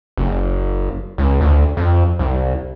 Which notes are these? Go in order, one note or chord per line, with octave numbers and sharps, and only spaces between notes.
F#1
C#2
D2
F2
C2